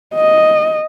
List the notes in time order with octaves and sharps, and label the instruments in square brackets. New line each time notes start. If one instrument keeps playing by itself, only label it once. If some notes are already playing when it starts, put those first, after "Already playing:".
[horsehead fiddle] D#5